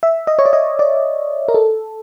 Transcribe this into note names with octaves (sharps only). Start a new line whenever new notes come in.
E5
D#5
C#5
D5
D#5
D5
A#4
A4